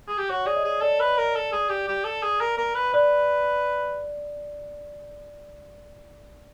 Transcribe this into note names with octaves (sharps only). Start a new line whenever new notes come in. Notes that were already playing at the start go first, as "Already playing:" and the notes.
G#4
G4
F#4 C#5
G#4 D5
D#5
G#4
A4 D5
B4
A#4
A4
G#4
G4
G4
A4
G#4
A#4
A#4
B4
B4 D5